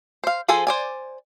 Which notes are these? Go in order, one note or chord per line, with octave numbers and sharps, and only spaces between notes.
C5 F5
F3 G#4 A4 C5 G#5
C5 D5 G#5